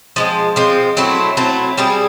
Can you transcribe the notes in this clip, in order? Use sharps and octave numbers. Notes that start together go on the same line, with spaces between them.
F3 G#3 C4
F3 G#3 C4
F#3 A3 C4 E4
F#3 A3 C4 E4
G3 C4 E4 G#4